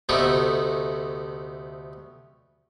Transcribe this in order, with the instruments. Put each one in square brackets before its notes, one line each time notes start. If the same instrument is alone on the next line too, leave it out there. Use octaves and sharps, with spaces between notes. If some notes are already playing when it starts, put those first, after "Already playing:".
[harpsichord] D2 C3 A3 B3 D#4 D6